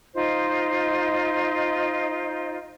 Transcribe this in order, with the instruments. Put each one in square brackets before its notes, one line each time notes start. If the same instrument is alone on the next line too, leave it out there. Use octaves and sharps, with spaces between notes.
[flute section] D#4 F4 C5 D#5